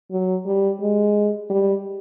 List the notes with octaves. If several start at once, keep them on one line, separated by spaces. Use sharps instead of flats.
F#3
G3
G#3
G3